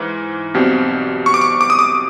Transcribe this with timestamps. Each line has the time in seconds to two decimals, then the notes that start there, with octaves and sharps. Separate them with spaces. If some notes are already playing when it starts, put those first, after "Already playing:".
Already playing: G#2 E3
0.54 B1 B2 G3 C4
1.26 C#6
1.34 D6
1.41 C#6
1.61 D6
1.70 D#6
1.79 D6